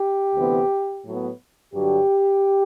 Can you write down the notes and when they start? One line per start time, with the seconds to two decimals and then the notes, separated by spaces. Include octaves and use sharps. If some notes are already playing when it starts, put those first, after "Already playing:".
Already playing: G4
0.35 D2 C3 E3 B3
1.05 A2 F#3 B3
1.74 G2 D3 F#3 G4